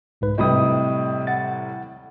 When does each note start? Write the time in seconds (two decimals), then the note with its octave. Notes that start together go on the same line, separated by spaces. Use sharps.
0.21 B1 G#2 B4
0.38 A2 C3 G3 D#5 B5 D#6
1.27 F#5 A6